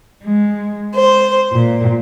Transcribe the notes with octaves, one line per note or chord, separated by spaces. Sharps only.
G#3
C5
A#2